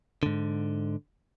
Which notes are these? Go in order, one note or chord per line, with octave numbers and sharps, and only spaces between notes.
G#2 D3